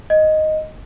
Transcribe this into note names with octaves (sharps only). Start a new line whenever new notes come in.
D#5